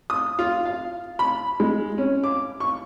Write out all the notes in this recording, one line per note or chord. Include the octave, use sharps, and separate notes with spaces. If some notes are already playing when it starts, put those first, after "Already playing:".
D#6
F4
F5
B5
G#3
C#4
D6
C#6